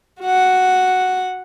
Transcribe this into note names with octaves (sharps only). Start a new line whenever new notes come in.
F#4 F#5